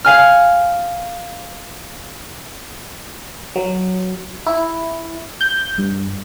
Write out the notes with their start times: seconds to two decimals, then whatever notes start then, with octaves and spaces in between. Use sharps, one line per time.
0.05 F5 G#5 F6
3.56 F#3
4.46 E4
5.41 G6
5.78 G2